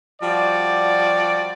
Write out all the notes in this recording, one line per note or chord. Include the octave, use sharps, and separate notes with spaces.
F3 G3 F#4 D5